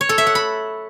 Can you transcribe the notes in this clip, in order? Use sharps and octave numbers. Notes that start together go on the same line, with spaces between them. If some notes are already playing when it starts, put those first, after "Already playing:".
C#5
A4
E5
F#5
B5